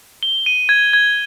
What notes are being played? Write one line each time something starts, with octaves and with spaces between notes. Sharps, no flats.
G7
D#7
G#6
G#6